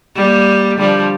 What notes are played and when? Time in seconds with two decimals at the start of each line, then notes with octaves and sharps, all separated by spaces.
0.15 G3 A#3
0.77 D3 F3 G3